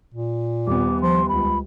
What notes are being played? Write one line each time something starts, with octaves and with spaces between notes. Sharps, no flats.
A#2
D#1 B3 D6
F3 C6
C#2 B5